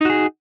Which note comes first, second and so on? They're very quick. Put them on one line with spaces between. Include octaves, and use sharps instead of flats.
D#4 F#4 G#4